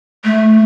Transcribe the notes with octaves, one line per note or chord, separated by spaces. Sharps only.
A3